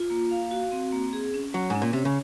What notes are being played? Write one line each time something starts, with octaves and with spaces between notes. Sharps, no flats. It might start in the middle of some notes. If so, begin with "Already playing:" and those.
Already playing: F4
A#3
F5
F#4
C4
A#3
G#4
C#4
F#3 C#5
G#2
C#4
A#2
C3 C#5
C#3